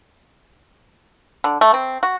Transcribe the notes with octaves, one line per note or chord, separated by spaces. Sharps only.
D3
A3
C4
F#4